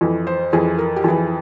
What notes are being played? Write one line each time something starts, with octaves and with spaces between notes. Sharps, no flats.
F2 E3
C5
F2 E3 G#4
A#4
G4
F2 E3 G#4